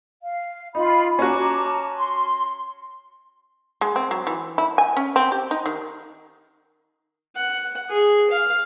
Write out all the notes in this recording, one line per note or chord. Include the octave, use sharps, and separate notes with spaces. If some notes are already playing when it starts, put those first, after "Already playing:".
F5
D#4 F4 B5
C#4 F#4 A5 A#5 D6
C6
G#3
C4
F#3
E3
E4
G#5
C#4
C4
G4
D#4
D#3
F#5
G#4
F5